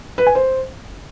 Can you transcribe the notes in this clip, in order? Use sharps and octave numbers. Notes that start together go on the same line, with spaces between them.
B4
G#5
C5